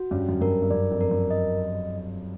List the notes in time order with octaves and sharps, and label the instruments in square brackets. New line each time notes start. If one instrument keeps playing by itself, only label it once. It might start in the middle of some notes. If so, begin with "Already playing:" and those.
Already playing: [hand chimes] F#4
[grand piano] G2 [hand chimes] C#4
[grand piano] F#2
[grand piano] G2 [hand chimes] A#4
[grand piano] G2
[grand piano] F#2 [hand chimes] D5
[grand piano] F2
[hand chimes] A#4
[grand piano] F#2
[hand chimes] D#5